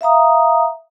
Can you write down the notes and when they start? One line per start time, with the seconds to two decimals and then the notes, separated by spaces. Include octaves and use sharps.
0.01 E5 F5 A#5 D#6